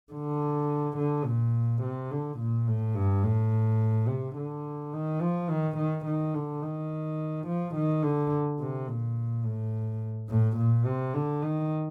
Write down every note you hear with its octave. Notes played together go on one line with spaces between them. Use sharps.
D3
D3
A#2
C3
D3
A#2
A2
G2
A2
C3
D3
D#3
F3
D#3
D#3
D#3
D3
D#3
F3
D#3
D3
C3
A#2
A2
A2
A#2
C3
D3
D#3